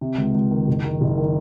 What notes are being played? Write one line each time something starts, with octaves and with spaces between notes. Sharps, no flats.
C3
C#2
C#2
D#3
F#1
D#3
F#1
D#3